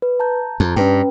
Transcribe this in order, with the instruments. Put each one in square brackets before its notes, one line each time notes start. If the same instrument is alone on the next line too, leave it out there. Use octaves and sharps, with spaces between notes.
[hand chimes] B4
A5 A#5 G6
[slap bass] F2 [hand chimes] A5 A#5
[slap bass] G2 [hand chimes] C#4 B4 G5